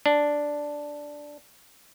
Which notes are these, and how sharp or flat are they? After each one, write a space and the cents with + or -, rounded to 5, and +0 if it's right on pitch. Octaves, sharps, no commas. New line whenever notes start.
D4 +0